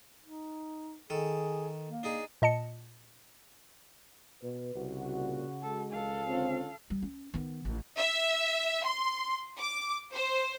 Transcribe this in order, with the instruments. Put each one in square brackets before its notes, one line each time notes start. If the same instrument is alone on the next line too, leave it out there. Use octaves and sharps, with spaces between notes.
[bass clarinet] D#4
[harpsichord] D#3 A4 [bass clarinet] G#4
[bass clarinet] A#3
[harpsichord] D4 D#4 G#4
[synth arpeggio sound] A#2 D#5 A5 C#7
[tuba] B2 [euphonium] B4
[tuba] C2 [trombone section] C#3 F#4
[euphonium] A#2
[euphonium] G#3 [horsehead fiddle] A4
[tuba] C#2 [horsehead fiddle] A4 F5
[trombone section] D3 C#4 F4 [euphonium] C4
[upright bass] G3
C#4
D#3 B3
A1
[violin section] E5
C6
D6
C5